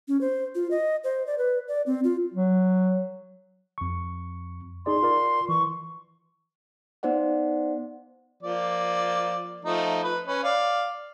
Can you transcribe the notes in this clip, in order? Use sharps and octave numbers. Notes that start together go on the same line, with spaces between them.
C#4
C5
F4
D#5
C5
D5
B4
D5
C4
F4
F#3
F2 C#6
D#4 G#4 D5 C6
F4 A#4 D5
E3 C#6
B3 D#4 C5 D5 F#5
F3 A#3 D5
F3 A3 D#4
B4
C#4 B4
D5 F5